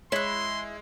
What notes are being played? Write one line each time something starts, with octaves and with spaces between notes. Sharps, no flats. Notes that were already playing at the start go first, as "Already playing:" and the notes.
G#3 E4 C#5 C6 F#6